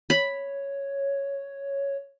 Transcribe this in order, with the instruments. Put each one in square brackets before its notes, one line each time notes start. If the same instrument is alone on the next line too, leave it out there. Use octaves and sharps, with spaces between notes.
[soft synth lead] C#5 [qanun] B5